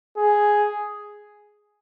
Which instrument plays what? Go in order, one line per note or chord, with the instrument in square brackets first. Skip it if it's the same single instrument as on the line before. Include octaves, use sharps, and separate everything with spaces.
[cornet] G#4